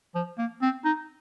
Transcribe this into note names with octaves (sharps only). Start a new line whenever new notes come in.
F3
A#3
C4
D#4